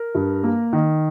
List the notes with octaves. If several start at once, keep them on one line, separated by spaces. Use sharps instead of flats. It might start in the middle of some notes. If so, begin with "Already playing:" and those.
Already playing: A#4
G2
A#3
D#3